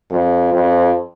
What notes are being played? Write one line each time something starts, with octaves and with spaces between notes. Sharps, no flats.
F2
F2